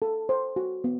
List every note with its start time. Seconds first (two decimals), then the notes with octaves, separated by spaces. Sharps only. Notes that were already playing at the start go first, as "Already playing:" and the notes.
0.02 A4
0.29 C5
0.56 F#4
0.84 B3